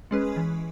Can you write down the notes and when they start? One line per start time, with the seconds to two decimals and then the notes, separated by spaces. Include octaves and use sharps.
0.11 G#3 C#4 G#4 B4
0.36 E3